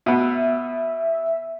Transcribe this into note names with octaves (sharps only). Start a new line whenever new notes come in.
B2 B3 E5